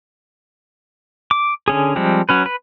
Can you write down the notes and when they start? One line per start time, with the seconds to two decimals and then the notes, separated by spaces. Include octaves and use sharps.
1.31 D6
1.68 D3 C#4 G#4
1.96 F3 G3 G#3 C4
2.29 F#3 C#4 B4
2.46 B4